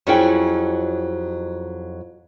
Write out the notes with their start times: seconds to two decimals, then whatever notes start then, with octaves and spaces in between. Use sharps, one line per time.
0.07 F2 F#3 C#4 E4 G#4 G5